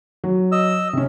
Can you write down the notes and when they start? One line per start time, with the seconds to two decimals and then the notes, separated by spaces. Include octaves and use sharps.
0.24 F#3
0.52 D#5 E6
0.93 C3 C#4